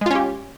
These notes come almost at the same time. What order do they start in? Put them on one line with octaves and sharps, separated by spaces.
G#3 F4 C#4 G4